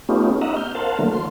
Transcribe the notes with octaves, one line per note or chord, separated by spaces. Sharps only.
A3 B3 C#4 D#4 F4 G4
D#5 E5 F#5 A#5
F6 G6
A#4 C5 F5 F#5 A5
D3 E3 F#3 A3 A#3
C6